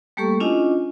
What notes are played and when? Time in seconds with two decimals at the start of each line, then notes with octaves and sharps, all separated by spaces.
0.17 G3 A3 A#3 G4 A4 C#6
0.40 C#4 D4 E4 F4 D#5 G#5